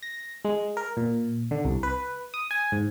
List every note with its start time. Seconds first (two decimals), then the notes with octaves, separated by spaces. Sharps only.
0.03 A#6
0.45 G#3
0.77 A#4
0.97 A#2
1.51 D3
1.65 C2
1.83 B4
2.34 D#6
2.51 G#5
2.72 G#2